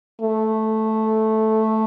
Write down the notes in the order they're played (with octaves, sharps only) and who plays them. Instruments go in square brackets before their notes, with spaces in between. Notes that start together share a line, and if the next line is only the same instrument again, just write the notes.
[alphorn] A3